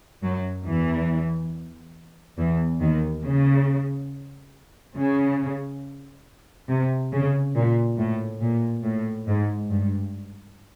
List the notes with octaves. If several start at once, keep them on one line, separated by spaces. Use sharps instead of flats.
F#2 F#3
E2 E3
E2 E3
D#2 D#3
C#3
C#3
C3
C#3
A#2
A2
A#2
A2
G#2
G2